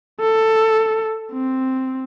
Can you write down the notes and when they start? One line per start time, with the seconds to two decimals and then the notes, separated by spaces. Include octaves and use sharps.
0.20 A4
1.33 C4